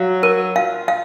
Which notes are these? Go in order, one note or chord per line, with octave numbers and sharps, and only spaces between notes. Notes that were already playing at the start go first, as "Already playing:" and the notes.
Already playing: F#3 F5
A#4
F4 F5
F5